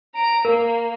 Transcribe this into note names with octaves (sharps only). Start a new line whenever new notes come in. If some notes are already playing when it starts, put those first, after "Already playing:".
A#5 D7
A#3 A#4